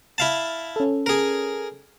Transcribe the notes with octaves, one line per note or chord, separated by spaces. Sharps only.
E4 F5 A5
C#4 A4
G#4 A#4